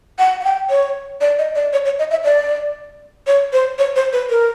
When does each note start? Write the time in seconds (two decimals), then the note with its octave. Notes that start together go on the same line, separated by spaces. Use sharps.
0.19 F#5
0.40 F#5
0.44 G5
0.70 C#5
1.21 D5
1.39 D#5
1.55 D5
1.73 C#5
1.85 C#5
1.99 D#5
2.11 E5
2.24 D5
3.27 C#5
3.53 C5
3.78 C#5
3.96 C5
4.13 B4
4.30 A#4